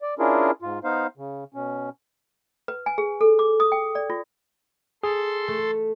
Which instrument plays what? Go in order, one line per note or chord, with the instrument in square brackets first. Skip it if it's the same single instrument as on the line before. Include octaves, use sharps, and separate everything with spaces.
[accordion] D5
C#4 D4 E4 F4 G#4 A#4
G#2 F4
B3 D#4 C5 F5
C#3
B2 C#4
[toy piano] B4
G#5
G#4
A4
D6
D#6
G5
D5
F4
[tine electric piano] G#4 [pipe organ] A4 C6
[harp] A3